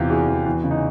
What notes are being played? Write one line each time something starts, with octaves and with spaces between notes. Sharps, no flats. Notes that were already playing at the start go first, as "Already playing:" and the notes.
Already playing: E2 C3 F4 G4
E3 F#4 G#4
E2
E2
C#3
D#4